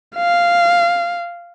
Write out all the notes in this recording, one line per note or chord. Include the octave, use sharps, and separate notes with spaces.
F5